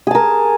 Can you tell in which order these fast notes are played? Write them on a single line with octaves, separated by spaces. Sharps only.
G#4 A5 A#4